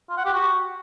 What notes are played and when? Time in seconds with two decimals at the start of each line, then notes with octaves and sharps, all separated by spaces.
0.09 F4
0.17 F#5
0.25 G4
0.33 F#4